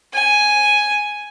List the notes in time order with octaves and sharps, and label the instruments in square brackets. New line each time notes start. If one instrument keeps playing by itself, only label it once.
[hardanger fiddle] G#5